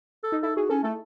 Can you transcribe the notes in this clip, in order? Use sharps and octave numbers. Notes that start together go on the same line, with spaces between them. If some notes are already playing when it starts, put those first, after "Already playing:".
A4
D#4
E4 A4
F#4 G#4
C#4 A4
A3 A4